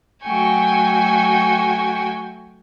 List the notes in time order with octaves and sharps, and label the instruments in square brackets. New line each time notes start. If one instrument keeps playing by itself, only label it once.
[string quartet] F#3 A3 F#4 G5 G#5 C#6